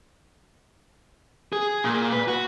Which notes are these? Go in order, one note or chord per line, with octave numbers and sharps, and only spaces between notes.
G#4
A#2
B4
F#4